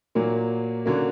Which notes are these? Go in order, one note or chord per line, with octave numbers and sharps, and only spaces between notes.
A#2 F#3 A#3
D3 F#3 A#3 C#4